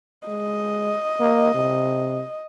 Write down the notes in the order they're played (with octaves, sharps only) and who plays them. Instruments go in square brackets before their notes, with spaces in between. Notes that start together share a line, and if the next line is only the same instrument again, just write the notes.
[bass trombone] G#3 [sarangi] D#5
[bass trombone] A#3
C3